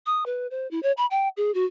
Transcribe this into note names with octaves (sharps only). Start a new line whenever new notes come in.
D#6
B4
C5
E4
C#5
B5
G5
G#4
F#4